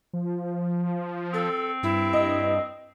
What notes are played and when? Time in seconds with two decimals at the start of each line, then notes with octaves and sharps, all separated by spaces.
0.13 F3
1.33 C4 A4
1.83 G2 E4
2.13 D#5